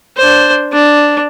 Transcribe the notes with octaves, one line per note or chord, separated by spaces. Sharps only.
D4 C5
D4